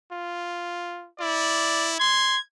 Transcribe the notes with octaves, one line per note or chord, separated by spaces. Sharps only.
F4
E4 D5
C6 G#6